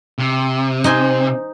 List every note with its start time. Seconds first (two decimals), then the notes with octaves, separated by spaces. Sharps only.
0.18 C3
0.84 D#4 C5 G#5